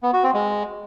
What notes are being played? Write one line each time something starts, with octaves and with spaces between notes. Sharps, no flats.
B3
F#4
C4
G#3